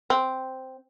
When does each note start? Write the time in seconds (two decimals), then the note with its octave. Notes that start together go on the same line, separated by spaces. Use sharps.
0.10 C4